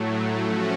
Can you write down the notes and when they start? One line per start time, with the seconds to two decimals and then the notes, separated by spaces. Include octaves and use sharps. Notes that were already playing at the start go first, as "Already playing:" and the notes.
Already playing: A2 F#3 A3
0.40 F3 A3 C#4 F#4